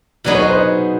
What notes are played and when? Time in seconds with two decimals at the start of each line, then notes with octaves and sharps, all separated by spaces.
0.24 B2 F#3 B3 D#4 G#4 D5
0.35 C#5
0.42 D#5
0.50 C5
0.57 D#5